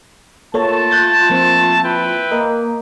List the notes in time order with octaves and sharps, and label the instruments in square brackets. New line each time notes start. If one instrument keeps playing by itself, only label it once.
[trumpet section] A3 A5 [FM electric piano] A#3 A4 C#5 [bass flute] F4
[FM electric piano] F#6 G6 A6
F3 A#3 C4
[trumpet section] E4 B4 G5
[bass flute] A#3 [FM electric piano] A#4 D#5